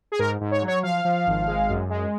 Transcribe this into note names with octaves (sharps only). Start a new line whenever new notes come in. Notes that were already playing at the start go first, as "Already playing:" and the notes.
G#4
G#2 A#4
G#2
C#5
F#3
C#5
F3 F5
F3
G#1
G#3
F#2
G#3